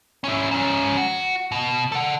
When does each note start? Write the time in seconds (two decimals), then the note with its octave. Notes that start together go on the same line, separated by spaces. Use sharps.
0.24 C#4 E4
0.51 G#2 C#4
0.97 F#4
1.52 B2
1.92 A4 F#5